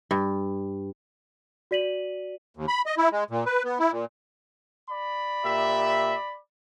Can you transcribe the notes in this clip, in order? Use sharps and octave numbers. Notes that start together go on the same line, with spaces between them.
G2
F#4 D5 B6 D#7 F#7
D#2
B5
D#5
E4
G#3
A#2
B4
B3
E4
A#2
D5 B5
A#2 G4 E5